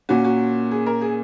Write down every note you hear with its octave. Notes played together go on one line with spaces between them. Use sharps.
A#2 A#3 C#4 F#4
F#4
G#4
A#4
G#4